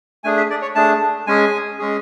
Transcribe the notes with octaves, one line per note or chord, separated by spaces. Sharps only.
A3 D4 G#4 G#5
E5
D5
C#5
A3 D4 G#4 A5
G#3 C#4 G#4 G#5
G#3 C#4 G#4